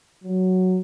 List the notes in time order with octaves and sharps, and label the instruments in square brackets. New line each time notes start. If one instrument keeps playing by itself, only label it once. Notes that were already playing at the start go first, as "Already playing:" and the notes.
[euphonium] F#3